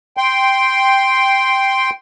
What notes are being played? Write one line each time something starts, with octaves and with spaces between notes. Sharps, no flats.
G5 C6